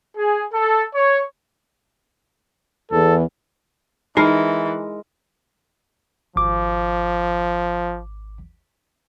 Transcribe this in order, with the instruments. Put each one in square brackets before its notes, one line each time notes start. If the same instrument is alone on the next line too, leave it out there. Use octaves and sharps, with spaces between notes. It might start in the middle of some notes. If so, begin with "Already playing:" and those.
[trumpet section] G#4
A4
C#5
[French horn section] E2 [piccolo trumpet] A4
[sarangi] E3 [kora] G#3 A#4 [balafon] D#4
[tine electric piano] G#1 D6 [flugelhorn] F3